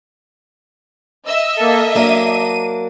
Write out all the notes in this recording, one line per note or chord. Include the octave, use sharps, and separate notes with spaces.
D#5 E5 E6
A#3 A4
F#3 A#3 D4 D#7